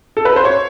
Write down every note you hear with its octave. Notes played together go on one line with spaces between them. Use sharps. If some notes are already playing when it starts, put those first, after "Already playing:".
A4
B4
C5
C#5